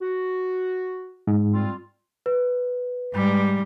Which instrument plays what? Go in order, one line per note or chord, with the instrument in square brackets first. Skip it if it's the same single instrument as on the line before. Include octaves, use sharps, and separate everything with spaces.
[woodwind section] F#4
[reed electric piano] G#2
[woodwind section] G3 C4 F4
[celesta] B4
[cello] G#2 G3